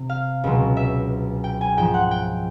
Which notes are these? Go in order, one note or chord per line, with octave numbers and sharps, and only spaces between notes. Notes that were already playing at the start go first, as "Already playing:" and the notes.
Already playing: C3
F5
C#2 B2 F#3
E5
G5
G#5
G#2 F3 G5
F#5
G5